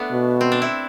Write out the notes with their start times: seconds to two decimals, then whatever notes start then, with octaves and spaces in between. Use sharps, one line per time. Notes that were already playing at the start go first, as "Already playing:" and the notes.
Already playing: A3 B3 D4
0.11 B2
0.41 C4
0.52 D4
0.62 E4